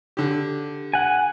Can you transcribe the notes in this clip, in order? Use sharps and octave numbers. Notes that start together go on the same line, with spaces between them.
D3 G4
F#5 G#5